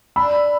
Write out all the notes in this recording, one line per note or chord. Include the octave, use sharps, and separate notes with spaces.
D4 B5 E6